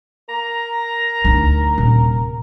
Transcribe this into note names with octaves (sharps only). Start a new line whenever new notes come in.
A#4 A#5
D2 D#4
D#1 C3